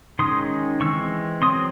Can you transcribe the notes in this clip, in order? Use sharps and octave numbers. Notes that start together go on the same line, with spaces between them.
D#3 G#3 C#4 C6 D#6
E3 G#3 C4 C#6 E6
F#3 C4 C6 D#6